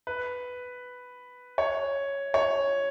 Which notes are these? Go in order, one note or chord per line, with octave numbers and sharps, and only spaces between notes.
B4
C#5
C#5